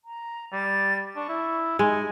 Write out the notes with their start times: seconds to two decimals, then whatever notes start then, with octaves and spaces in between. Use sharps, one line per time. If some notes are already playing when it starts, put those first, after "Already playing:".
0.05 A#5
0.53 G3 A6
1.16 D4 C#6
1.29 E4
1.79 G#3 D#4 G#5